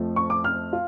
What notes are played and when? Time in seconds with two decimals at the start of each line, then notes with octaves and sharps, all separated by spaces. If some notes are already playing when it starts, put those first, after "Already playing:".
Already playing: F2 F3 A3
0.16 C#6
0.30 D6
0.44 F6
0.73 F4